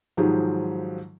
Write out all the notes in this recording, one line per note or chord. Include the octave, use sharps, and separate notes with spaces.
G#2 D#3 F3 F#3 G4 G#4